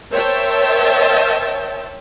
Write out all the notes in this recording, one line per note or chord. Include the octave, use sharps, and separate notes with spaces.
A#4 C5 C#5 E5 G5 A5